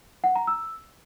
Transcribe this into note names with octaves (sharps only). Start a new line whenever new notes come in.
F#5
A#5
E6